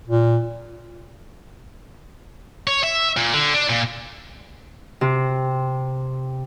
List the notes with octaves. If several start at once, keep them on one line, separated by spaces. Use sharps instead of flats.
A#2
C#5
E5
A#2
D3
D4
A#2
C3